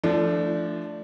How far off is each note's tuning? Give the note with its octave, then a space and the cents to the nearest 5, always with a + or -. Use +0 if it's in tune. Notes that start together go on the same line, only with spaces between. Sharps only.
F3 -30 A3 +0 D4 +0